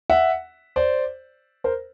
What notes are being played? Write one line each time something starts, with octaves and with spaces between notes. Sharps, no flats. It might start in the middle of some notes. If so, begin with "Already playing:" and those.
E5 F#5
C5 D5
A#4 C5